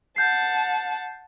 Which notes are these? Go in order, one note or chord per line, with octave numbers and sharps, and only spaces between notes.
F#5 A5 G6 C7